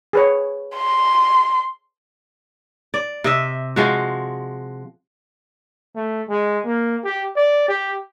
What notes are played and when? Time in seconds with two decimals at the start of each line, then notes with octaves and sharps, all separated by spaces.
0.13 G#4 B4 C#5
0.76 C6
2.94 D5
3.24 C3 D#5 E5
3.76 F3 G#3 F#4
5.95 A3
6.29 G#3
6.66 A#3
7.04 G4
7.36 D5
7.68 G4